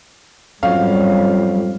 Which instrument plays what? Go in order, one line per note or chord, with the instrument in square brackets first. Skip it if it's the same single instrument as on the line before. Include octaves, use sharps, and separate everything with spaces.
[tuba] F2 [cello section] G#2 G3 [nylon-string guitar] F#3 C#4 C#5 [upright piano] F5